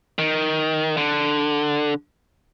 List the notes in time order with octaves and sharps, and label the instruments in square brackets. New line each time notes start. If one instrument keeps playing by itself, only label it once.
[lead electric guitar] D#3
D3